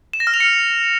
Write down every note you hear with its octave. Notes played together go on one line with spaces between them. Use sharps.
E7
A#6
F6
F7
C#7